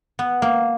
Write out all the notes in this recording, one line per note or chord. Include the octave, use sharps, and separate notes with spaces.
B3
A#3